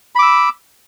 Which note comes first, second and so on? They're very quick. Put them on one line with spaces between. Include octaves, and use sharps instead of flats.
B5 D6 E6